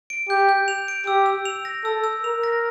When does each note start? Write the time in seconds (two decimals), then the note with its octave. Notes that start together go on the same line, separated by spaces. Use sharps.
0.10 D7
0.29 G4 G6
0.49 G6
0.68 F7
0.88 D7
1.07 G4 E6
1.26 E6
1.45 F7
1.65 A#6
1.84 A4 E6
2.04 E6
2.23 A#4 F7
2.43 A#6